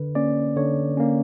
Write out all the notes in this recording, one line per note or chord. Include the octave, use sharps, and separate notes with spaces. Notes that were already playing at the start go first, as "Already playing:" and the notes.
Already playing: D3 B4
A#3 C#4 D5
D3 C#5
A#3 C#4